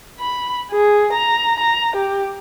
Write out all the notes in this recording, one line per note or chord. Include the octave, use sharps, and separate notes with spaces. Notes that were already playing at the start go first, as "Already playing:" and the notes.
B5
G#4
A#5
A#5
G4